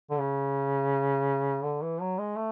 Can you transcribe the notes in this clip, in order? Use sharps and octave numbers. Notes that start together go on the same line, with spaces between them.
D3
C#3
D3
E3
F#3
G#3
A3